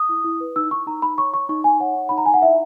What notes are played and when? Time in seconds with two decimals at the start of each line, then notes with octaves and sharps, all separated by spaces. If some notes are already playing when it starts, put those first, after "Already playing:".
Already playing: D#6
0.09 E4
0.24 E4
0.40 B4
0.56 D#4 E6
0.71 D#4 C#6
0.87 D#4 A#5
1.02 D#4 B5
1.18 C#5 C#6
1.34 D#4 C#6
1.49 D#4 C#6
1.64 D#4 G#5
1.80 C#5 F#5
1.96 D#4
2.09 D#4 B5
2.18 A#5
2.26 D#4 G#5
2.34 F#5
2.42 E4 E5